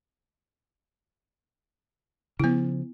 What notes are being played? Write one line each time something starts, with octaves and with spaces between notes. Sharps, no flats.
C#3 F3 B3 E4